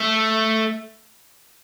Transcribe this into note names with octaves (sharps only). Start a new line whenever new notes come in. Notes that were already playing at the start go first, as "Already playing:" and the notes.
Already playing: A3